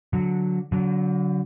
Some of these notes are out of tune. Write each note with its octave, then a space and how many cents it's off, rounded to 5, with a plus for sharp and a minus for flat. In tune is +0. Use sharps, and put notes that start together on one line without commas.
D3 -10 F#3 -15
D3 -30 F#3 +0